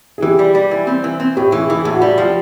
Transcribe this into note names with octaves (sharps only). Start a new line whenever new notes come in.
G#4
E3 G4
G3
G3
E3
C4
E3
C4
A2 G4
E3 G#4
E3 G#4
A2
F#4
G3
F3 G4